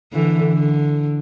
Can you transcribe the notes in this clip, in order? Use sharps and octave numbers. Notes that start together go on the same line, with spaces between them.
D3 E3
D3